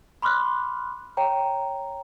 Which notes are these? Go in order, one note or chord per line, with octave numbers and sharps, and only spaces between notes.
B5 C6 D6 F6 F#6
C#5 G5 A#5